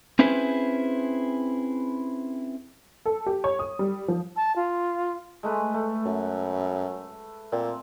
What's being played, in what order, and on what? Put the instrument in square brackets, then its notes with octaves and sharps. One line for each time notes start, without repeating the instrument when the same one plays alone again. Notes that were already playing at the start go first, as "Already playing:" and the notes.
[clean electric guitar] C4 C#4 E4 G#4 B4 C5
[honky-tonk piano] A4
G4
C#5
D#6
G3
F3
[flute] A5
F4
[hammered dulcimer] G#3 A3 B4
A3
[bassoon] F#2
[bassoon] A#2 [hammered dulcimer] C4